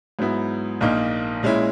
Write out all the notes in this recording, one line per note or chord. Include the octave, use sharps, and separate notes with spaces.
G#2 F#3 B3 E4
A#1 A#2 A#3 D#4
A#2 G#3 C#4 E4